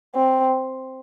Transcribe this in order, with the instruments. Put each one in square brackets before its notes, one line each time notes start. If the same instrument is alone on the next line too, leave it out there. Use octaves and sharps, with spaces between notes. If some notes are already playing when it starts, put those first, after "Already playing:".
[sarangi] C4